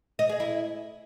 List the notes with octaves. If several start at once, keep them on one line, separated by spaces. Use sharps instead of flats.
D#5
G#4
E4